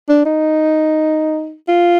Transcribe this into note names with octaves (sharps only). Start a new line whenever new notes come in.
D4
D#4
F4